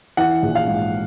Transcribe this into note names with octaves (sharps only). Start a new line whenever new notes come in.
E3 F#5
A#1
F5
G#2